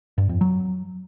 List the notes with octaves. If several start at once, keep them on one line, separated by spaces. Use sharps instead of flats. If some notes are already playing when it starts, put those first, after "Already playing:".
G2
F2
F#3